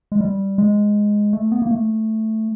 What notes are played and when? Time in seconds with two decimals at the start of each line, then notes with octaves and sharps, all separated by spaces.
0.12 G#3
0.21 G3
0.58 G#3
1.33 A3
1.52 B3
1.62 A#3
1.71 A3